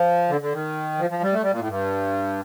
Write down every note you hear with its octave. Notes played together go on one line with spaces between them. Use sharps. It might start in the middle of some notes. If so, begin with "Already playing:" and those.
Already playing: F3
D3
D3
D#3
F3
F3
G3
A3
G3
A#2
A2
G2